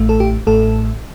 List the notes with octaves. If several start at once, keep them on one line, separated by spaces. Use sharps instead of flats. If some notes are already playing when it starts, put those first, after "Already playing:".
Already playing: A1 A2 A3
A4
G4
A1 A2 A3 A4